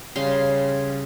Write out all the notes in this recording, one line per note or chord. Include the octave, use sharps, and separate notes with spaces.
C#3 G3 F5 C6